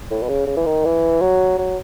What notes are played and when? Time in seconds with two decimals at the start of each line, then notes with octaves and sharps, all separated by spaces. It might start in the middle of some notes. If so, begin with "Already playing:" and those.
0.11 A2
0.23 B2
0.29 C#3
0.47 C#3
0.57 E3
0.66 D#3
0.85 E3
1.21 F#3
1.58 F#3